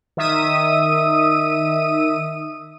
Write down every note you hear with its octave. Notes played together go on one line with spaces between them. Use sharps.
D#3 E5 D#6 D#7